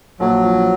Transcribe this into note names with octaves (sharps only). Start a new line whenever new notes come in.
A#1 F#3
F3